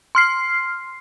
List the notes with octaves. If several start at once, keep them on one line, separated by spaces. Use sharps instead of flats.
C6 F6 C7